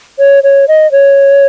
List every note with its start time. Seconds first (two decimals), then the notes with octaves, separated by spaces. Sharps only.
0.19 C#5
0.43 C#5
0.68 D#5
0.92 C#5